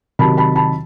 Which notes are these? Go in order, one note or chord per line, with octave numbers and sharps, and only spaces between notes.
C3 D#3 F#3 A5 B5
A5 B5
A5 B5